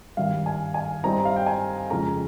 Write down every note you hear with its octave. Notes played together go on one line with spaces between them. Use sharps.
G#1 G2 G3 F5
G#5
G#5
G2 G3 C4 D#4 A#5
F5
G5
G#5
F2 C#3 G#3 C#4 A#5